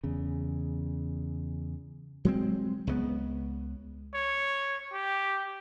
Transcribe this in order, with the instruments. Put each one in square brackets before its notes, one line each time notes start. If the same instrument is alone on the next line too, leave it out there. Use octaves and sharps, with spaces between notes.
[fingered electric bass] E2 C#3
[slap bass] F#3 G#3 C4
C#2 C#3 F#3 B3
[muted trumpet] C#5
G4